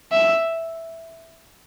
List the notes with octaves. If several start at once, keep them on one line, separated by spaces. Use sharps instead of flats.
E5